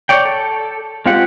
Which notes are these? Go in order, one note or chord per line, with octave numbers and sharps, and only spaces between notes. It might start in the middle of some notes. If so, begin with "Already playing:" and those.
C#5 D5 G5
A4
G#3 C4 F4 G4 F#5